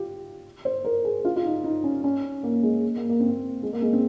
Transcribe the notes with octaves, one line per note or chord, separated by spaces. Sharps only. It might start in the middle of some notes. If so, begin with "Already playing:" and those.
Already playing: F4 G4
C5
A#4
G#4
F4
F4
D#4
D#4
C#4
C#4
A#3
G#3
A#3
A#3
C4
A#3
G#3
A#3
G#3
C4